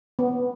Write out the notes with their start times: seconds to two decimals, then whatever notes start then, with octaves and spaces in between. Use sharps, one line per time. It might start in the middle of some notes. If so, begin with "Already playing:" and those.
0.19 B3